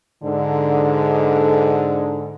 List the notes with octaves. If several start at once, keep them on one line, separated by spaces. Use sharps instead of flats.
G#2 D3